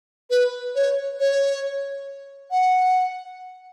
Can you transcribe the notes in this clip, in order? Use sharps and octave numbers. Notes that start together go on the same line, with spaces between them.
B4
C#5
C#5
F#5